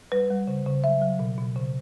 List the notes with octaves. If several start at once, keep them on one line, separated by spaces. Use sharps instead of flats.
G3 B4
G3
C#3
C#3
F#3 E5
F#3
B2
B2
C#3